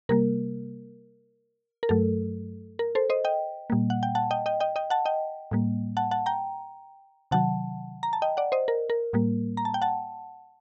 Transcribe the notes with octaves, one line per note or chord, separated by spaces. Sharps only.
C3 G3 A#3 A#4
A#4
G2 F#3 A3 A4
A#4
A4 C5
C5 D#5
D#5 G5
A#2 G3 A#3
F#5
G5
F#5 A5
D#5 G5
D#5 G5
D#5 G5
D#5 G5
F#5 A5
D#5 G5
A2 G3 A#3
F#5 A5
F#5 A5
G5 A#5
C3 D#3 F#3 F#5 A5
A#5
A5
D#5 G5
D5 F#5
C5 D#5
A#4
A#4
A2 G3 A#3
A#5
A5
G5
F#5 A5